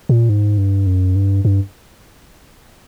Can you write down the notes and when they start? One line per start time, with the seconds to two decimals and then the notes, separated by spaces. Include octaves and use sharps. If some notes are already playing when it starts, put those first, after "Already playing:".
0.09 A#2
0.29 G#2
0.58 G2
0.87 F#2
1.16 G2
1.45 G2